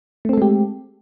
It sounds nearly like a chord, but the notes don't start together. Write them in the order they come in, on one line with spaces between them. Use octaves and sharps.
A3 C4 A4 G#3 G4